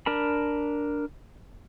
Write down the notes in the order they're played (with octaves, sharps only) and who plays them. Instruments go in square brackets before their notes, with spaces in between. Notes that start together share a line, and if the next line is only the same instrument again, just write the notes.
[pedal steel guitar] D4 A#4 A5 B5